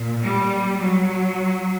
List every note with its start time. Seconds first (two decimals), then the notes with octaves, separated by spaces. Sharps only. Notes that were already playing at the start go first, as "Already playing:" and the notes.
Already playing: A#2
0.23 G3
0.82 F#3